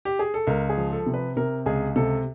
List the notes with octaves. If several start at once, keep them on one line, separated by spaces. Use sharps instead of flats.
G4
G#4
A4
C#2 A#4
G#4
F3
A4
C3
B4
C3 A#4
C#2 G#4
C3 A4